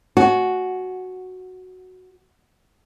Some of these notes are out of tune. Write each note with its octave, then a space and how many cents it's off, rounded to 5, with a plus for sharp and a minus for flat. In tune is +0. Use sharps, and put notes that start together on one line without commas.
F#4 +0 G#5 +35